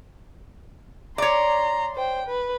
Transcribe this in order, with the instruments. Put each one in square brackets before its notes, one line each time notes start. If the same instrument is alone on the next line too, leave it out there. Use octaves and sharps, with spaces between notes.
[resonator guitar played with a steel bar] C#5 D5 [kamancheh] A#5 C6
[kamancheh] C5 G5
B4